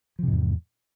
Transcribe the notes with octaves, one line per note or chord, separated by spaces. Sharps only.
E2 G#2 C3 F3